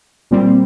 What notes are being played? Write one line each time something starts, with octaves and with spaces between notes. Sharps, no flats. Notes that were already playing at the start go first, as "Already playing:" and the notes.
A#2 G3 C4